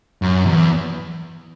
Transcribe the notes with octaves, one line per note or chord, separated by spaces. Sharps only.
F#2
E2